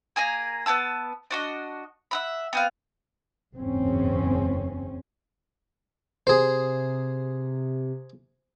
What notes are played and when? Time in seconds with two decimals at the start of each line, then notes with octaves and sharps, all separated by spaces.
0.16 A#3 G#4 G#5 A#5
0.66 B3 E4 A5 E6
1.31 D4 F#4 D#5
2.11 E5 F#5 B5
2.53 B3 C4 F5
3.54 F#1 E2 G#2 C4 C#4
6.27 C3 G#4 C5